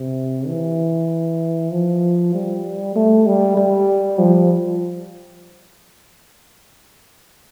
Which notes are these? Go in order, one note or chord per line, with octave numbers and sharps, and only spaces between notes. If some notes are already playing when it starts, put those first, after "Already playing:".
Already playing: C3
E3
F3
G3
A3
G3
G3
F3